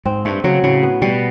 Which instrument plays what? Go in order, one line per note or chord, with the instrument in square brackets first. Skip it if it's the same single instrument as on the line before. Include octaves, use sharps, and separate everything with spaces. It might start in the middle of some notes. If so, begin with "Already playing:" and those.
[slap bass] G#2 [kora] C4
[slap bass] G2 [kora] A3
[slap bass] C#3 [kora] F#3
[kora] A2 [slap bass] C#3
[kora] B3
[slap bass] B2 [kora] G3